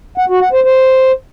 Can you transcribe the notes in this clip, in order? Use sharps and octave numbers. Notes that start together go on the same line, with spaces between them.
F#5
F#4
F#5
C5
C5